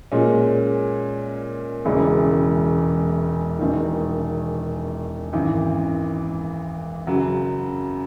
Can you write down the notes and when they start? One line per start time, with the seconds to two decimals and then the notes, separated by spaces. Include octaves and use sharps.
0.12 A#2 G#3 C#4
1.85 E1 E2 C#3 E3 G#3
3.59 E1 E2 D#3
5.33 G#1 F#2 E3
7.07 F#2 C#3 F#3